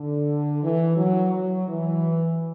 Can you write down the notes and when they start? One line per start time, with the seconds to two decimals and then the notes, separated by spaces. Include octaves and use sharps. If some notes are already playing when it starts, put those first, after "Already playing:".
Already playing: D3
0.62 E3
0.97 F#3
1.32 F#3
1.68 E3